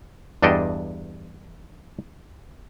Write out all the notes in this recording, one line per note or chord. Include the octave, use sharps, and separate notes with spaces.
E2 G2 D4 A4 D#5 G5